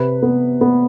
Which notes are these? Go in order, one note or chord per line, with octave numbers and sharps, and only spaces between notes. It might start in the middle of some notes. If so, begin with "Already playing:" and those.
Already playing: C3 B4
B3
B3